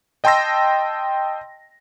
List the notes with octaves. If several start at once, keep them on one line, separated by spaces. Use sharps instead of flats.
D#5 G5 A5 C6 E6 A#6